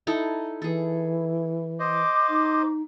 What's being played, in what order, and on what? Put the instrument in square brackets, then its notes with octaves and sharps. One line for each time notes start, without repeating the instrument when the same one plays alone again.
[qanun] D#4 E4 A4
[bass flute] E3 [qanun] G#4 A4
[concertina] C5 D#5 [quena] D6
[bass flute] D#4